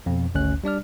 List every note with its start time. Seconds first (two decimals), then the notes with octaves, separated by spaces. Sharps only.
0.06 F2 B2
0.35 G#1 D2 C#4 F#6
0.64 G3 D4 D5 F6